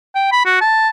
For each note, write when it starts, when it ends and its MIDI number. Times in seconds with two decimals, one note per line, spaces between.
0.15 0.27 79
0.32 0.42 83
0.46 0.60 66
0.61 0.89 81